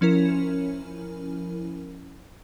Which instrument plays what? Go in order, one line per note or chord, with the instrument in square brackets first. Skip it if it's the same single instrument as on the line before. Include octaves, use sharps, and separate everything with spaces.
[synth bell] F3 C#4 E4 A#4